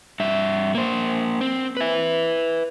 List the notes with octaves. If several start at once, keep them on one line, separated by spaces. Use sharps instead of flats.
G2 E5
A#3 C5
C4
B4 E5